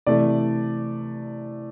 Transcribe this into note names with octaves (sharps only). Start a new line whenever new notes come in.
C3 E3 A3 D5